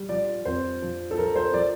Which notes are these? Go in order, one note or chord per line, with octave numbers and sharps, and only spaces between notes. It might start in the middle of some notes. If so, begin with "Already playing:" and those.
Already playing: G3
F3 D5
F2 C5
F3
A4
F3 A#4
C5
F3 D5